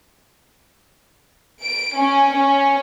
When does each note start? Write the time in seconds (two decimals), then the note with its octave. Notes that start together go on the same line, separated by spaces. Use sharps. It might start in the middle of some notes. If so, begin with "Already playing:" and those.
1.63 D7
1.98 C#4
2.37 C#4